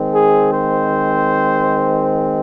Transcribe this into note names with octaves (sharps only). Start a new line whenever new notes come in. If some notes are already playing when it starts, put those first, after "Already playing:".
Already playing: D#3 G#3 C4
G#4
C5